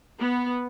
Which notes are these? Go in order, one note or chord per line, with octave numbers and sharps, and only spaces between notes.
B3